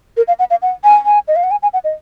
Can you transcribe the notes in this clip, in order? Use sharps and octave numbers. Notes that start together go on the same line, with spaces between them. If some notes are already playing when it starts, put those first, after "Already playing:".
A#4
F5
F#5
F5
F#5
G#5
G#5
D#5
F5
F#5
G#5
G#5
F#5
D#5